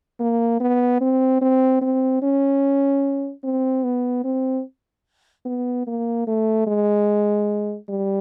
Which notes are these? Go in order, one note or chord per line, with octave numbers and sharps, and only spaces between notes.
A#3
B3
C4
C4
C4
C#4
C4
B3
C4
B3
A#3
A3
G#3
G3